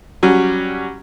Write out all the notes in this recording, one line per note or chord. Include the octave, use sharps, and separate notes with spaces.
F#3 G3 C#4